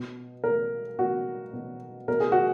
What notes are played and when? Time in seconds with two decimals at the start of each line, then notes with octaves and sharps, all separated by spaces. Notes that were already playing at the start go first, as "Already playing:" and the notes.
Already playing: B2
0.44 B2 A#4
0.99 B2 F#4
1.53 B2
2.08 B2 A#4
2.20 G#4
2.32 F#4